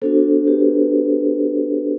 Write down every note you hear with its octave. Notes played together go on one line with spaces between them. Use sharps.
B3 D4 F#4 A4 C5
G4 B4